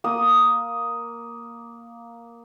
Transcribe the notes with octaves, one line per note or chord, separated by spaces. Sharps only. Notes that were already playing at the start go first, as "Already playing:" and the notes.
A#3 D#6